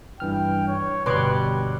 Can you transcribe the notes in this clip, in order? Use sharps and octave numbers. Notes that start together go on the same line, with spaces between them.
G2 E3 G5 F6
C#5
G1 B2 G3 C#5 C6 D6 F#6